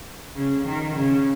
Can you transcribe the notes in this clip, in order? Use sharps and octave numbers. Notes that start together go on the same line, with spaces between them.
C#3
D#3
C#3